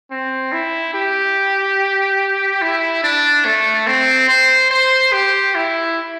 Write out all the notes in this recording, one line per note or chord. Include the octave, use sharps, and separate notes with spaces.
C4
E4
G4
E4
D4
A3
C4
C5
C5
G4
E4